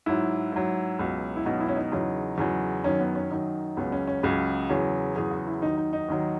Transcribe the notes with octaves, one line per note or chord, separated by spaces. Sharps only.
G#2 F#3 E4
G#2 F#3
C#2 B2 F#3
E4
C#2 B2 F#3 D#4
E4
C#4
D#4
E2 C#3 F#3
E2 C#3 F#3
F#2 D#3 F#3 C#4
B3
C#4
F#2 D#3 F#3 D#4
C#2 C#3 F#3 B3
C#4
C#4
C#2 C#3 F#3
E2 C#3 F#3
E2 C#3 F#3 G#4
F#4
E4
D#2 D#3 F#3 D#4
D#4
D#4
D#2 D#3 F#3